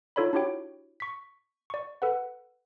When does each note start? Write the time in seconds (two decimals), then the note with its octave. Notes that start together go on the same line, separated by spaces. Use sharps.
0.16 D#4 F4 A4 C#5 D5 B5
0.33 D4 E4 F#4 G4 C#5 G5
1.00 C#6 B6
1.70 D5 C#6
2.02 A4 B4 F#5